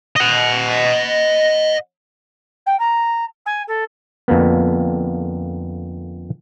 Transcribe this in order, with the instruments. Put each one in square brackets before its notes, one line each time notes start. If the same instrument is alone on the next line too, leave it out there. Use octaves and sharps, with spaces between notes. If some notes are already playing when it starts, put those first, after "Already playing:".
[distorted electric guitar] D#5 F#5
[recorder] G5
A#5
G#5
A4
[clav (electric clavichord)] F2 D3 A#3 B3